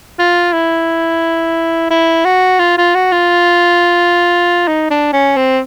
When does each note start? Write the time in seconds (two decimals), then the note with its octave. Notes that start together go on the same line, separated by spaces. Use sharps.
0.19 F4
0.53 E4
1.90 E4
2.25 F#4
2.59 F4
2.78 F4
2.95 F#4
3.12 F4
4.68 D#4
4.90 D4
5.13 C#4
5.36 C4